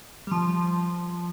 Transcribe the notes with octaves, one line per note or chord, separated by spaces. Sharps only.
G3
F3